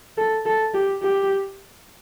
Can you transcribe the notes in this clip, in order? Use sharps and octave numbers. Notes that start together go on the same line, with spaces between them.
A4
A4
G4
G4